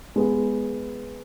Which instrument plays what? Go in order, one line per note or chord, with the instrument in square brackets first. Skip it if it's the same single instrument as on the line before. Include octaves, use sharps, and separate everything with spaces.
[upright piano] G#3 B3 G#4